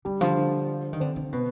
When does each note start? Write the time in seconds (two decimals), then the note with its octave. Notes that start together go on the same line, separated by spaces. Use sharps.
0.05 D3 G3
0.21 D3 F3
0.37 D3
0.93 D#3
1.00 D3 C4
1.16 D3
1.32 B2 B3